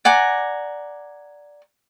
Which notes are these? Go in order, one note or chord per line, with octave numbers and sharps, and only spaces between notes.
D5 F#5 G#5 A#5